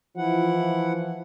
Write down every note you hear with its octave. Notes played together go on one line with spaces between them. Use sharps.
E3 F3 E4 F#5